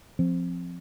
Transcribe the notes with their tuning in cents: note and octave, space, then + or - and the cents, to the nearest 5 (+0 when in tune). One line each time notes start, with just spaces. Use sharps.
F3 +0 C4 +0